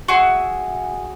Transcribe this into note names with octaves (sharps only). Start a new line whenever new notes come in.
F#4 G#4 E5